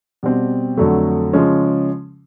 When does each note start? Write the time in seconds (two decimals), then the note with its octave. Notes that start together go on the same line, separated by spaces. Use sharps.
0.23 B2 G3 C4
0.77 F2 D3 F#3 A3
1.33 C#3 F3 G#3 C#4